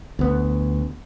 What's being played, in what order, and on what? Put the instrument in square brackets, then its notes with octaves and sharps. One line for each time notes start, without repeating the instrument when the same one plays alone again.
[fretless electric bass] D2 B3